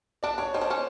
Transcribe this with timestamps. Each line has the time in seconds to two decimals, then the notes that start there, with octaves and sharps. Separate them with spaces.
0.23 D4 D5
0.38 D4 C#5
0.54 D#4 C5
0.61 D4
0.70 C#4